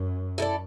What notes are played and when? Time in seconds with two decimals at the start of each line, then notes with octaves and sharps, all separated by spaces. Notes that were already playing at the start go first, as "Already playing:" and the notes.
Already playing: F#2
0.38 E4 A4 D5